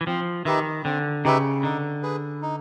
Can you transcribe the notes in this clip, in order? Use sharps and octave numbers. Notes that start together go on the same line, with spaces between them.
E3
F3 C4
D#3 D#4 G4 B4 E5
D3 C4
C#3 D#4 G4 B4 E5
D3 D#4
G#4 B4
D#4